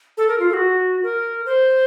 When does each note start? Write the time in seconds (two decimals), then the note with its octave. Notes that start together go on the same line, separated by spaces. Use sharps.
0.17 A4
0.28 A#4
0.39 F4
0.49 A4
0.53 F#4
1.03 A#4
1.46 C5